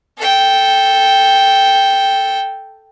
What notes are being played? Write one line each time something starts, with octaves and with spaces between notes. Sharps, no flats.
A4 G5